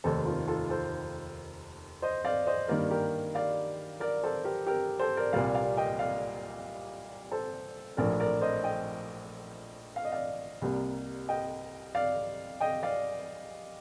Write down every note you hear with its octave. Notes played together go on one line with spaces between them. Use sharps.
F1 D#2 D#3 A3 A4 C5
F4 A4
F4 A4
A4 C5
C5 D#5
D5 F5
C5 D#5
G2 D#3 G3 A#3 A#4 D5
G4 A#4
D5 F5
A#4 D5
A4 C5
G4 A#4
G4 A#4
A4 C5
A#4 D5
C2 A#2 G3 A#3 D5 F5
D5 F5
D#5 G5
D5 F5
A4 C5
A#1 A2 F3 A#4 D5
A#4 D5
C5 D#5
D#5 G5
F5
D#5
D5 F5
C2 C3 G3 A#3
D#5 G5
D5 F5
D#5 G5
D5 F5